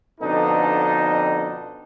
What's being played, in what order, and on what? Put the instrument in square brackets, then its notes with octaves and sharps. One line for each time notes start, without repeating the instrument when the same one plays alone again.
[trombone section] F2 B2 D3 D4 D#4 A4